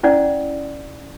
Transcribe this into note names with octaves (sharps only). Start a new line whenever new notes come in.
C#4 E4 D5 F#5